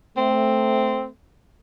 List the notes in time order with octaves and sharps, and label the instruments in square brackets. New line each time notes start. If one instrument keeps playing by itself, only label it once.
[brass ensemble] A3 [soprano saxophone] C4